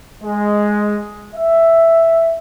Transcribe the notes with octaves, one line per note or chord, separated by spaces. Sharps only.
G#3
E5